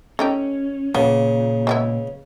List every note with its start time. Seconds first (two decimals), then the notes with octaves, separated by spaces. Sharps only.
0.19 A3 C#4 D#4 G4
0.95 A#2 C#3 B3
1.67 G#3 B3 E4